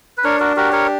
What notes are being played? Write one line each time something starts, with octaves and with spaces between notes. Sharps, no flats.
B4
D4 A#4 C#5
F#4 A#4
F#4 G4 A#4
A#4 C#5